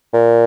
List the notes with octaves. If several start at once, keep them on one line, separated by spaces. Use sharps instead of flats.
A#2